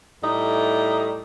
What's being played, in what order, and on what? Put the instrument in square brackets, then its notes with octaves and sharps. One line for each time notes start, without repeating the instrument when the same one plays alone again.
[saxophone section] A2 G3 A3 D#4